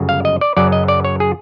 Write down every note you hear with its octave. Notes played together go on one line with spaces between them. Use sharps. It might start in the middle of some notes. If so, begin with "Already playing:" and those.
Already playing: G1 F#2 C#3
F5
D#5
D5
F#2 C#3 F#3 D5
D#5
D5
C#5
G#4